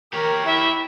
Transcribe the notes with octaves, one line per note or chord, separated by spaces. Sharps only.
G4 A#4 C#5
E4 E5